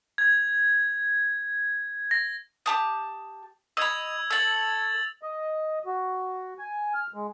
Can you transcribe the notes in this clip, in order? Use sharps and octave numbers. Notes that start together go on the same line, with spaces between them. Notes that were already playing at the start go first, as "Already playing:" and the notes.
G#6
A#6
G4 A5 D#6
D#5 B5 E6 G#6 F7
A4 C#5 E6 A6 F#7
D#5
F#4
G#5
F6
G#3